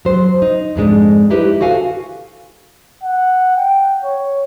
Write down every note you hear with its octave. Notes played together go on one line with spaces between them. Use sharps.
F#3 C5
D#4
F2 G#2 G#3 D4
D#4 E4 G4 B4 C5
F#4 A4 F5 G#5
F#5
G5
C#5